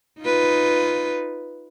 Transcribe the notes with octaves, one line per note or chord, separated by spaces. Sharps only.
D#4 F4 B4